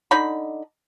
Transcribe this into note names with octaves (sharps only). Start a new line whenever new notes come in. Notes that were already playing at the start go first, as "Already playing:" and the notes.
D3 D#4 B5